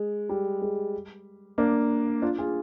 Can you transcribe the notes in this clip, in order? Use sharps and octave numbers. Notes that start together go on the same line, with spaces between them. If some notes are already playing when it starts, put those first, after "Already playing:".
Already playing: G#3
G3
G#3
A#3 D4
D4 F4
F4 G#4